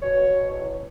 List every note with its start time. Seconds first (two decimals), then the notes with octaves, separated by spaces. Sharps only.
0.02 B2 C#5
0.26 B2
0.50 E2